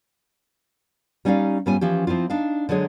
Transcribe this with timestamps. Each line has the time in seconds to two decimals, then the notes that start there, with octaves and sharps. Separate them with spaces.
1.25 G3 C#4 D#4 D5 F5
1.66 G#2 G3 B3 C#4 F4 G#5
1.81 E3 F3 C#4 G4
2.07 F3 C4 E4 F4
2.30 D4 D#4 F5
2.69 D3 F#3 G#3 G#4 C#5